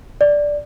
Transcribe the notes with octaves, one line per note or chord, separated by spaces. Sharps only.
D5